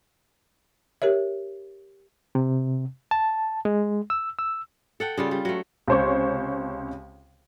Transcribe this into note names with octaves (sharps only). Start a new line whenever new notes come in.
G4 A#4 C#5 E5
C3
A5
G#3
E6
E6
A4 F#5 G5
C#3 G3 F4
G3
F#3 A3
C#2 C3 C5 C#5 C#6